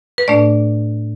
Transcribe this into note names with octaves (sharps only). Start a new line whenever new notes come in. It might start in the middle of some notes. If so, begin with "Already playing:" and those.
B4
A2 A3 D4 D5